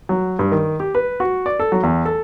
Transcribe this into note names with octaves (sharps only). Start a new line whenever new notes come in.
F#3
G2
D#3
G4
B4
F#4
D5
A4
F#3
E2
A4